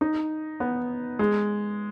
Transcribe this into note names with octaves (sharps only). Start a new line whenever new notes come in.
D#4
B3
G#3